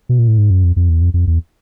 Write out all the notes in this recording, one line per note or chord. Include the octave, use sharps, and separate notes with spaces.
B2
A#2
A2
G#2
F#2
F2
F2
E2
F2
F2
E2